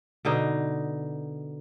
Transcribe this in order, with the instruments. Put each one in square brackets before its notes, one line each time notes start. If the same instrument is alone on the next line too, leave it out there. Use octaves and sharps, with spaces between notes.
[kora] B2 D3 D#4